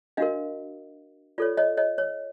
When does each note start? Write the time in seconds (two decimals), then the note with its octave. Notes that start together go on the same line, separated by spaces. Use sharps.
0.17 D4 F#4 A#4 D#5 F5
1.38 F4 A4 C#5 D5
1.57 C#5 D#5
1.77 C#5 D#5
1.98 C#5